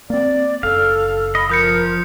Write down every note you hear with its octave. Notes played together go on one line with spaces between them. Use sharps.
A#3 C4 D5
F#1 A4 F5
D#5 B5
F3 A#4 D#6 G6 C#7